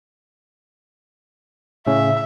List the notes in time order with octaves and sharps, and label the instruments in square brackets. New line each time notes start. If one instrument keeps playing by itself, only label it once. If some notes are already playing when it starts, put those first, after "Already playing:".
[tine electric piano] A2 C#3 C#4 [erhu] E5